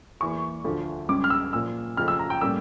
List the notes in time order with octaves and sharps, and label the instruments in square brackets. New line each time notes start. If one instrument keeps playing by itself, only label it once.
[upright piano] E2 E3 A#3 C#6
D2 D3 F3
C#2 C#3 G3 C#4 D6
F6
E6
A#2 F3 A#3 E6
F2 C#3 F3 A3 C#4 F6
E6
A#5
G5
A2 G3 A#3 C#4 E6